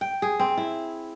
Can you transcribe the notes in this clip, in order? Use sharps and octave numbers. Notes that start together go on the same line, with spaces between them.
G5
G#4
C4
E4